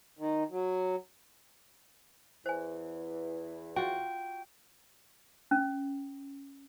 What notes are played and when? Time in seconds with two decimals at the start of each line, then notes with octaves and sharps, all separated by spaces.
0.19 D#3
0.50 F#3
2.46 E2 E3 C5 G#5
3.76 F4 F#4 G5
5.51 C#4